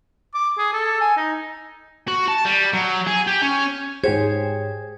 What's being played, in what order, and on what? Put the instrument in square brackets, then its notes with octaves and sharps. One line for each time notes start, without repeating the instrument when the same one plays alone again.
[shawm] D6
G#4
A4
G#5
D#4
[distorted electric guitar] F#4
A5
G3
F#3
G#4
G4
C#4
[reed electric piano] G#2 G#6 [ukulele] G4 C5 [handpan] G#4 [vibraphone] C#5